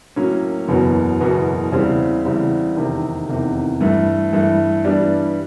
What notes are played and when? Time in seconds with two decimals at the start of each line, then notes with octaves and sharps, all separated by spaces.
0.16 A2 F#3 A#3 C#4
0.68 F#1 E2 B2 F#3 B3
1.20 F#1 E2 B2 F#3 B3
1.72 E2 C#3 E3 G3 C4
2.25 E2 C#3 E3 G3 C4
2.76 F1 E2 C3 D#3
3.29 F1 E2 C3 D#3
3.81 G2 E3 A3
4.33 G2 E3 A3
4.85 G2 E3 G3 B3 D4